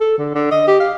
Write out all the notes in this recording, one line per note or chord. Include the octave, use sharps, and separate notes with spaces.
A4
D3
D3
D#5
G4
F5